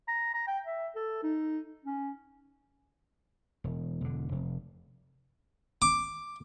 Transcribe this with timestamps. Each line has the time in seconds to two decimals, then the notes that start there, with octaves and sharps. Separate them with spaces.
0.08 A#5
0.34 A#5
0.47 G5
0.65 E5
0.95 A4
1.23 D#4
1.85 C#4
3.64 E1
4.01 E1 D3
4.32 F1
5.82 D6